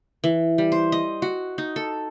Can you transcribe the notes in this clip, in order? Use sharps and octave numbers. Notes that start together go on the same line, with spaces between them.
E3
G3
C5
D#5
F#4
D#4
A4